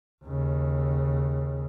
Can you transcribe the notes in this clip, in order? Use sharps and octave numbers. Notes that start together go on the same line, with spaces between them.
D#2 C#3